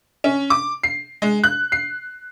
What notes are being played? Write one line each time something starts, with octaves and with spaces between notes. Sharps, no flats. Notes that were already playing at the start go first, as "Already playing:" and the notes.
C#4
D6
C7
G#3
F#6
C7